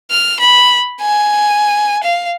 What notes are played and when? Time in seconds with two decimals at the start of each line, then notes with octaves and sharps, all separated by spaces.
0.11 F6
0.40 B5
1.01 G#5
2.03 F5